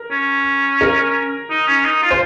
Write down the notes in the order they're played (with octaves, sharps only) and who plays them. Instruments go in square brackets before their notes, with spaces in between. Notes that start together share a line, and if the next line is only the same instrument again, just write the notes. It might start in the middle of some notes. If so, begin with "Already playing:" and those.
Already playing: [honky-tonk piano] A#4
[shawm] C#4
[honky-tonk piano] A#4
[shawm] D#4
C#4
D#4
F4
[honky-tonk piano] C5